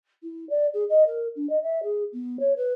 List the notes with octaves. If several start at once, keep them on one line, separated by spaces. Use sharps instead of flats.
E4
D5
G#4
D#5
A#4
D4
D#5
E5
G#4
B3
C#5
B4